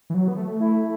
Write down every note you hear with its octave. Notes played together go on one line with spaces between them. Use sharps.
E3
F#3
B3
A3
E4